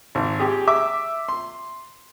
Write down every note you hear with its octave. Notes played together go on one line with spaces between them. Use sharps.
G#1
G4 G#4
E5 D6
C6